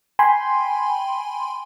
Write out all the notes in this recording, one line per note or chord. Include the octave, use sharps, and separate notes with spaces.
G5 G#5 B5 C6